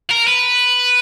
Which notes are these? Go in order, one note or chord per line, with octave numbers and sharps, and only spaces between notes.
A#4
B4